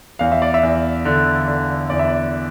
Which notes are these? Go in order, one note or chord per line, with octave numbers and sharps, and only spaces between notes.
E2 F5
E5
D5
E5
E2
D3
D3
E2 D5
E5
D5